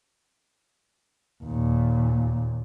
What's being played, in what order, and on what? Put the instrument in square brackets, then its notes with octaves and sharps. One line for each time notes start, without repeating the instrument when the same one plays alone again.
[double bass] D#2 A#2